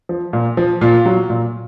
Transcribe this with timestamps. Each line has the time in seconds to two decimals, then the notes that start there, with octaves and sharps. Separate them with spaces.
0.09 F3
0.33 A#2
0.57 F3
0.81 A#2 F4
1.06 F#3
1.30 A#2